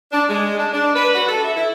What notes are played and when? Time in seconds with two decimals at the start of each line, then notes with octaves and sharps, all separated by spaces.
0.12 D4
0.29 G#3
0.58 D4
0.73 D4
0.96 B4
1.15 F#4
1.29 A4
1.44 E5
1.57 E4